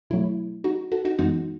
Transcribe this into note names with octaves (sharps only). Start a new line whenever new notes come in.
B2 F#3 A3 E4
D#4 F#4
F#4 A4
D#4 F#4
F#2 E3 G#3 B3 D#4 F#4